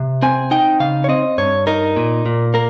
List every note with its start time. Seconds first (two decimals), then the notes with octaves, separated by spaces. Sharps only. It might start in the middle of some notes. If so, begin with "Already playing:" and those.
Already playing: C3
0.22 C4 G#5
0.51 D#4 G5
0.80 C#3 F5
1.04 C#5
1.09 C4 D#5
1.38 G2 C#5
1.67 D#4 A#4
1.96 A#2
2.26 A#2
2.54 A#3 A#4